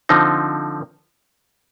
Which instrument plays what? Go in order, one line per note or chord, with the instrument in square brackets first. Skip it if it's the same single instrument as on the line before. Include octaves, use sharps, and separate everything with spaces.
[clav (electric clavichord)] D3 F3 C4 D#4